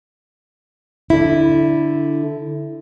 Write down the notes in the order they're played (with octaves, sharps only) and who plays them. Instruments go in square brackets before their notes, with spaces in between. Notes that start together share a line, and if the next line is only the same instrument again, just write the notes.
[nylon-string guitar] D3 E4